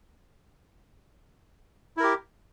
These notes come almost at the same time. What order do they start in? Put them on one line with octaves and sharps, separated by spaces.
E4 A#4 G4